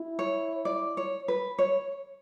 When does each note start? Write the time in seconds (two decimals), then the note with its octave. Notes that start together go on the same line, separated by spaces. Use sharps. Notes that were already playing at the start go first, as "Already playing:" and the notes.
Already playing: E4
0.19 C#5
0.65 D5
0.97 C#5
1.28 B4
1.59 C#5